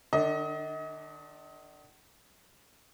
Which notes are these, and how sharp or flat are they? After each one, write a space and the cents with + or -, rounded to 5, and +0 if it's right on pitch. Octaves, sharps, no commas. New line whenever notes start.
D#3 -45 D4 +0 D#5 +35